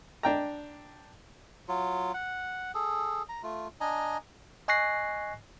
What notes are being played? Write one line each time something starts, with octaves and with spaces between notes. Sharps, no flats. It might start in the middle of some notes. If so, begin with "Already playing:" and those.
D4 G5 A#5
F#3 F4
F#5
G#4 A4
A#5
A3 F4
D4 D#5 G#5 A#5
D#5 G#5 C#6 F#6 A#6 C7